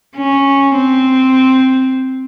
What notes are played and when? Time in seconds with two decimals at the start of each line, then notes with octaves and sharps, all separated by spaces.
0.16 C#4
0.75 C4